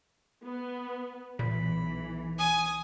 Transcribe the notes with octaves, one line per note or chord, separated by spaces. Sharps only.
B3
B1 A#2 E3 B5
G#5 D#6